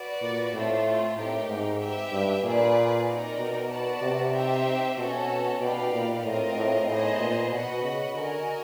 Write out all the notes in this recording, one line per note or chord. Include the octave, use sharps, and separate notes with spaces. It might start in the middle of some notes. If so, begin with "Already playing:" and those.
Already playing: F#4 B4 D5
A#2
A2 A3 C4 F4
A2 C4 D#4 G4 A#4
G#2
G4 B4 E5
G2
A#2 G#4 B4 D5
C4 D#4 F#4 A#4 D5
B2
F#4 B4 D5 F#5 A5
C3
C4 D#4 G4 C5 E5
B2 C#4 F#4 A4
B2 D#4 G4 B4 D5 F5
A#2
A2 C4 F4 A#4 D#5
A2
A2 B3 D#4 G#4 C5 D#5
A#2
B2 F#4 B4 D#5 F#5
C#3
D3 F#4 A#4 D#5 G#5